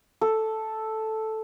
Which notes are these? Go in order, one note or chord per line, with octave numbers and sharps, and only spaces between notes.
A4